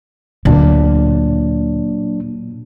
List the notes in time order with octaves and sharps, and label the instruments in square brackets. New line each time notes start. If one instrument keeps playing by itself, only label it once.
[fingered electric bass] D2 [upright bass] A#2 [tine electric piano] F#3 D4